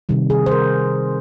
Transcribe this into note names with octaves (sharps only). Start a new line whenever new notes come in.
C3 D#3 G3
G#4
C5
A#4